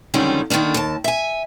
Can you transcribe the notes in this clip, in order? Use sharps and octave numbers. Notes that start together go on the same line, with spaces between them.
F2 D3 D#3 G3 G#3 C#4
D3 D#3 A3 A#3 D4
D#2 A5
E5 G#5